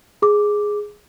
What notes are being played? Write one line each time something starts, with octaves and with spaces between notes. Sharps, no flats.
G#4 D6